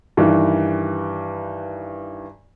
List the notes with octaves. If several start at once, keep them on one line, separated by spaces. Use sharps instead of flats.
G2 D#3 E3